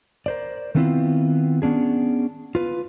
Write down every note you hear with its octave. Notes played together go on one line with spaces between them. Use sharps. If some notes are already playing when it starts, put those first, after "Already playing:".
A#4 C5 D5
D#3 A3 B3 C4 E4 F4
B3 C#4 D4 G#4
F4 B4